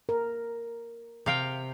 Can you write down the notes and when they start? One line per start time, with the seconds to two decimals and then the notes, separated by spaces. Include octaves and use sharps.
0.09 A#4
1.26 C3 F5 G5